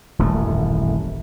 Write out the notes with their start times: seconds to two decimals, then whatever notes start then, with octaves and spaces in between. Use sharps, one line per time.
0.19 D#1 A1 F#2 A3